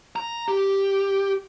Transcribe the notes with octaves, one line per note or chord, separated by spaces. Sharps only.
A#5
G4